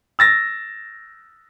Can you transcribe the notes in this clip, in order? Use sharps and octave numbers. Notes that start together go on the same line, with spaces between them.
E6 A6 A#6